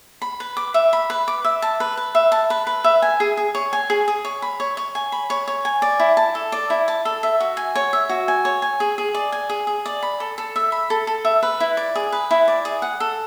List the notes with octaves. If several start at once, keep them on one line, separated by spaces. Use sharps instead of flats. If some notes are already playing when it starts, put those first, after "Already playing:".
B5
B4
D6
E5
B5
B4
D6
E5
A5
B4
B4
E5
A5
B4
B4
E5
G#5
G#4
G#4
C#5
G#5
G#4
G#4
C#5
B5
C#5
C#5
G#5
B5
C#5
C#5
G#5
D5
E4
A5
A4
D5
E4
A5
A4
E5
F#4
G#5
C#5
E5
F#4
G#5
C#5
G#5
G#4
G#4
D5
G#5
G#4
G#4
D5
B5
A4
A4
E5
B5
A4
A4
E5
B4
E4
D5
G#4
B4
E4
D5
G#4
F#5
A4